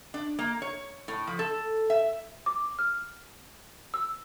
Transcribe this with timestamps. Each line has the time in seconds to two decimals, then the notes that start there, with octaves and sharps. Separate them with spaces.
0.14 D4
0.39 A#3
0.62 C#5
1.08 A2
1.27 F3
1.39 A4
1.90 E5
2.46 D6
2.79 F6
3.94 E6